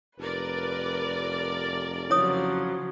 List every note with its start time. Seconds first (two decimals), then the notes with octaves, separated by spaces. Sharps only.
0.19 F1 A#4 B4 D5
2.10 C#3 F3 F#3 E4 C#5 D#6